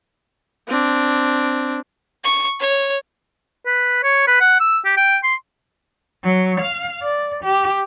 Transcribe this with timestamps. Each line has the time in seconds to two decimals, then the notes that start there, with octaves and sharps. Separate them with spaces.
0.68 C4 D4
2.24 C#6
2.59 C#5
3.66 B4
4.04 C#5
4.27 B4
4.40 F#5
4.60 E6
4.85 G4
4.97 G5
5.24 C6
6.24 F#3
6.60 F5
7.02 D5
7.44 G4